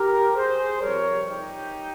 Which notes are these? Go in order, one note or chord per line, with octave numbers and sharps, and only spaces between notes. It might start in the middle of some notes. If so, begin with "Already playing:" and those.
Already playing: G4 A#4
G#4 C5
F2 C3 G3 A#4 C#5
D#4 G4